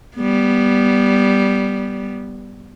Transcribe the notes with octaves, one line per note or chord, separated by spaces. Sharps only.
G3 B3